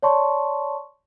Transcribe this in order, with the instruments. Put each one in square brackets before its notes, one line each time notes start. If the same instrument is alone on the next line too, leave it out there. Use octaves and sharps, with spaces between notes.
[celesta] C#5 D5 A5 C6 C#6